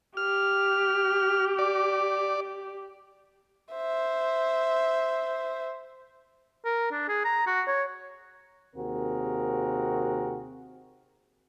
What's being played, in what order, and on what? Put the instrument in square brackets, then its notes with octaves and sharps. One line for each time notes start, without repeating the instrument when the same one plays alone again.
[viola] G4 [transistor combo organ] F6
[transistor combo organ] D5
[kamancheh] C5 E5
[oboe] A#4
D4
G#4
A#5
F#4
C#5
[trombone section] D#2 C3 C4 F#4 G#4 A#4